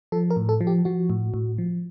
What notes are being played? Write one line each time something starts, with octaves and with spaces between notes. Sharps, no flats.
F3 A4
A#4
A2
A4
F3
G4
F3 F#4
A2
A2
F3